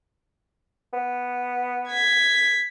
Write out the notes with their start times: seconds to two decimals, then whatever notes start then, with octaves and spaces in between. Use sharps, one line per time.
0.93 B3
1.90 G#6 B6